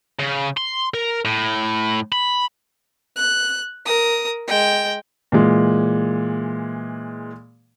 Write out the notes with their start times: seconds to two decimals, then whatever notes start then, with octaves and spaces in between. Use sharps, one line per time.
0.19 C#3
0.57 C6
0.94 A#4
1.25 A2
2.12 B5
3.16 F#6
3.85 A#4 D#6
4.48 G#3 G5
5.32 A#2 E3 G#3